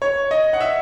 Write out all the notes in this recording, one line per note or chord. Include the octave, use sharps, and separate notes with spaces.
C#5
D#5
F#5
E5